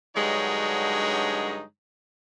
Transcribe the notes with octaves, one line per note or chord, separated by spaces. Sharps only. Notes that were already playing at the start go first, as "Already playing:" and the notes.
G2 D3 F#3 G#3 D#4 C#5